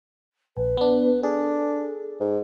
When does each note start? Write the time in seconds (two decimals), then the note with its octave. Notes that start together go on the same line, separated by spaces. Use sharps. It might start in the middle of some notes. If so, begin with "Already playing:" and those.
0.57 A#1 B4
0.77 B3 D4
1.23 D4 G#4 A4
2.20 G#2